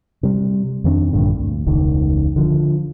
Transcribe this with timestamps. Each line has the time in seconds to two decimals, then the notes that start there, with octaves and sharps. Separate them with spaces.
0.23 C3 G3
0.84 F2 D#3 C4 D4
1.13 A#1 G2 A#2 D3
1.37 D2
1.66 E1 C#2 D#3
2.36 D3 F3